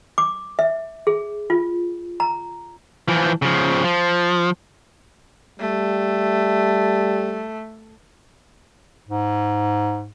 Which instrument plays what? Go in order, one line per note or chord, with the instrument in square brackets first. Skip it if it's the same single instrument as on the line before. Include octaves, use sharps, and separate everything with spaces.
[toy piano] D6
E5
G#4
F4
A#5
[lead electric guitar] E3 F3
C#3 F3
F3
[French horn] G3 [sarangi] A3
[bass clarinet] G#2